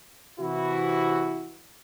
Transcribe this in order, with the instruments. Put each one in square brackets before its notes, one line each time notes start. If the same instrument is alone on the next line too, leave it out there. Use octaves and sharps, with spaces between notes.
[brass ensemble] C3 E3 E4 F#4